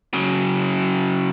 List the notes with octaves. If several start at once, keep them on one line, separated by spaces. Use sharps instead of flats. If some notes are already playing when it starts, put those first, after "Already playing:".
C#3 F#3